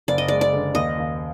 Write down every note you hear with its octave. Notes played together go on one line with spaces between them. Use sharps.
F#1 D5
D#5
G#3 D5
D5
D3
D#2 D#5
D#2